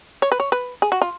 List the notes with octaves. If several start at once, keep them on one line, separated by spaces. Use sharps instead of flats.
C#5
B4
C#5
B4
G#4
F#4
F4